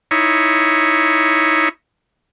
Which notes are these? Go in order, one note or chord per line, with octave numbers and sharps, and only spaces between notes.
D#4 E4 C#5